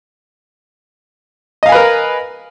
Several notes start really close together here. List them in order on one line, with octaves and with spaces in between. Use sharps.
D#5 F5 G#5 B4 A#4